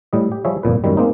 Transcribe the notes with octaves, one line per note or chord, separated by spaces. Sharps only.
A2 G3 D#5
G4
F3 G3 G#4 C#5 E5
G1 F2 A#2 B4
F#2 A2 D#3 G3
G#3 A#3 C4 D#4